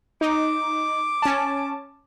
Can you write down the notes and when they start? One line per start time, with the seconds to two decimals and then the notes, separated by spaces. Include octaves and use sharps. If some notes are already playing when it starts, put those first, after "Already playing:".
0.21 D#4 D6
1.22 C#4 A5